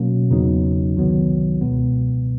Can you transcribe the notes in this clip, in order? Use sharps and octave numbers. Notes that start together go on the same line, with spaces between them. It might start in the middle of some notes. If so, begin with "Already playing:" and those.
Already playing: B2 F#3 A#3 C#4
E2 C#3 F#3 B3 D#4
C2 C3 D#3 F#3 B3
C#2 B2 G#3 B3